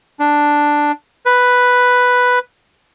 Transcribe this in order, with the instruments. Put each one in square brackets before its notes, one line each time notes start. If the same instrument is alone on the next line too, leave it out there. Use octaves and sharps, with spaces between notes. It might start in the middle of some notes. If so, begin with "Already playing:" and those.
[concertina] D4
B4